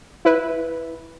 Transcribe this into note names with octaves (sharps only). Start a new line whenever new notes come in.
E4 B4